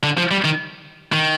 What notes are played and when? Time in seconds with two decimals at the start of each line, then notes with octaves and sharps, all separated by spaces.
0.04 D3
0.17 F3
0.31 G3
0.44 D#3
1.13 D#3